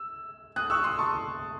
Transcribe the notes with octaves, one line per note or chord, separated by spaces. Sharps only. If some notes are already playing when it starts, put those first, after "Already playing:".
Already playing: E6
D#6 F#6
C#6 E6
C6 D#6
A5 C#6